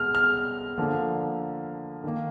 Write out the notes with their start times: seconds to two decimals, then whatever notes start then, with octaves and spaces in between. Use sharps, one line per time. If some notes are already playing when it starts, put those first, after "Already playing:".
Already playing: B2 G#3 F6
0.15 F6
0.78 D3 F3 A#3
2.04 D#3 A#3